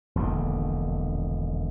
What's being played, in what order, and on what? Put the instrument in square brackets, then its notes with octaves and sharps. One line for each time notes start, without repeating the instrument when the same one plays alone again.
[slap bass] E1 A#1 D#2 D3